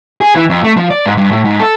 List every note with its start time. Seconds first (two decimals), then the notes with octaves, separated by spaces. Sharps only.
0.21 G#4
0.35 E3
0.50 F2
0.64 A3
0.77 F3
0.90 D5
1.06 G#2
1.17 G2
1.32 A2
1.45 G#2
1.60 A4